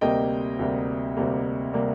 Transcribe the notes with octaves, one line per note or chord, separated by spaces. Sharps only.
D2 C3 G3 A#3 D#5 G5
D2 C3 G3 A#3
D2 C3 G3 A#3
C3 G3 A#3